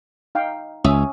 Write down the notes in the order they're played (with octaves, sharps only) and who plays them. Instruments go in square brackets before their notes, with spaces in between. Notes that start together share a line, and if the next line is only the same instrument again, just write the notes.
[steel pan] D#4 F5 G5
[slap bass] C#2 [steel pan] C#4 E5 D#6